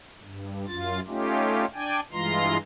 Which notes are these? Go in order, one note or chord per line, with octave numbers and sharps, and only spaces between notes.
G2
F#2 F4 A6
A3 C#4 D#4 F4 G4
D4 D5 G5 G#5
G2 E3 G#3 F4 A#5 C6